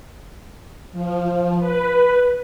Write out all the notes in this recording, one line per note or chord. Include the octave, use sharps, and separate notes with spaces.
F3
B4